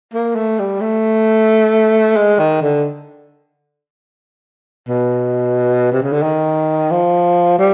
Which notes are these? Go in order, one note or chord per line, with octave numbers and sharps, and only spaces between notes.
A#3
A3
G3
A3
G#3
D#3
D3
B2
C3
C#3
D3
D#3
F3
G3